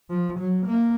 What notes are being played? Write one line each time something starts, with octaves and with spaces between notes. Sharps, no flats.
F3
F#3
A#3